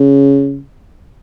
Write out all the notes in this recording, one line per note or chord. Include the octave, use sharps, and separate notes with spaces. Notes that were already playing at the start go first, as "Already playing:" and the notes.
Already playing: C#3